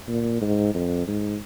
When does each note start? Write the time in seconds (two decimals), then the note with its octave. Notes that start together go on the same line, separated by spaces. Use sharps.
0.08 A#2
0.41 G#2
0.75 F2
1.08 G#2